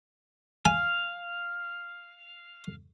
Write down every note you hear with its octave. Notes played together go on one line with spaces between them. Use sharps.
F5 G#5